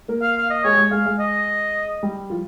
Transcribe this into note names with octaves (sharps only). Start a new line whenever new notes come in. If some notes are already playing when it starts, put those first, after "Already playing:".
A#3 A#4
F5
F5
D#5
G#3 G#4 C#5
G4
G#3 G#4
G#3 G#4 F5
G#3 G#4
D#5
G3 G4
F3 F4